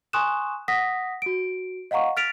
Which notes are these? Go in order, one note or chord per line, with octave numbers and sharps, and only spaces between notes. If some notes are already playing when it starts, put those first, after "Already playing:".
G#5 C6 C#6 D#6 F#6 E7
F#5 D#6 A#6 B6
F#4 D7
D#5 F5 F#5 A#5 C#6
F6 A6 B6 D7 F7